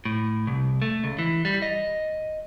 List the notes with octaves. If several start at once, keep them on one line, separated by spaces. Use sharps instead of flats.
A2
C2
A3
C#2
E3
G3
D#5